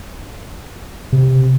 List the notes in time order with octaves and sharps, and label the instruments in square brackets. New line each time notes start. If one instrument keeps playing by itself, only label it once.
[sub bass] C3